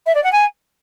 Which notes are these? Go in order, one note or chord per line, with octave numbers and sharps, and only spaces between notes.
E5
D5
F#5
G#5